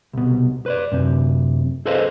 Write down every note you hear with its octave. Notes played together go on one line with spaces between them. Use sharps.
C2 B2
B4 C5 D5
F#2 C3
G#4 A4 B4 C5 D#5 F5